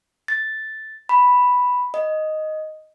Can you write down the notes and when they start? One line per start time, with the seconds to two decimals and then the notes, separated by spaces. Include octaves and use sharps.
0.28 A6
1.09 B5
1.94 D#5